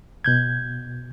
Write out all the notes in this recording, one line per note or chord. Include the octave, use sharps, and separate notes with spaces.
B2 G6 G#6